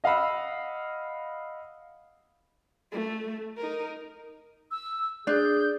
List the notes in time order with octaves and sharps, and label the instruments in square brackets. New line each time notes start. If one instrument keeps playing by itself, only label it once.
[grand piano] D#5 F5 F#5 B5 E6
[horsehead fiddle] A3
D#4 A#4
[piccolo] E6
[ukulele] D4 [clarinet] G#4 [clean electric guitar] D5 [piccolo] G6